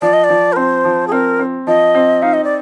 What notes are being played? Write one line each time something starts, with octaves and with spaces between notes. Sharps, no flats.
F3 D5
D#5
D5
F3
A#4
C4 C5
F3
G#4
C4 A#4
C4
F3 D#5
C4
D#4 F5
D#5
D5